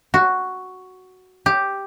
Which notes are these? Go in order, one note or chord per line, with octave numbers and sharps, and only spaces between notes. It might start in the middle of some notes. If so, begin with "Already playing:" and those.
F#4
G4